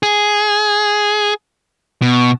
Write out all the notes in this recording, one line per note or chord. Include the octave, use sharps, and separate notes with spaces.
G#4
B2